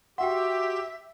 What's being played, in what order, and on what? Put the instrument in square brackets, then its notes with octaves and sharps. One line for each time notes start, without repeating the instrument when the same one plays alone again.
[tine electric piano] F#4 C6 [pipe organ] G4 [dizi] E5 [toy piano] F#5 G5